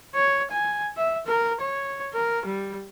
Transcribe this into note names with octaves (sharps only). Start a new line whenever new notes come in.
C#5
G#5
E5
A#4
C#5
A#4
G3